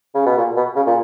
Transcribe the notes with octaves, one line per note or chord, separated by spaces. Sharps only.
C#3
B2
A#2
B2
C#3
A#2